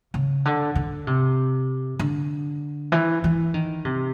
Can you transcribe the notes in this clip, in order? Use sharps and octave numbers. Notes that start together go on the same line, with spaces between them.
C#3
D3
D3
C3
D3
E3
E3
D#3
C3